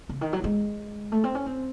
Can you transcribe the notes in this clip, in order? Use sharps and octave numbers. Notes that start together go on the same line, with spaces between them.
C#3
D#3
F#3
G#3
A3
C4
C#4
C4